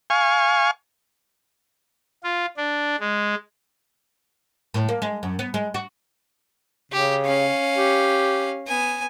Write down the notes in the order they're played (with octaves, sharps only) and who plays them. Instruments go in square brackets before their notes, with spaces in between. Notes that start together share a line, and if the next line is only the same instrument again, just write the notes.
[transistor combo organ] F5 G#5 C#6
[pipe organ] F4
D4
G#3
[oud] A2
A#3
G#3
F#2
B3
G#3
F#4
[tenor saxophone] C#3 [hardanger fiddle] G4
[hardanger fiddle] C#4 F5
[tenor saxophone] G4
[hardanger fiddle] B3 G#5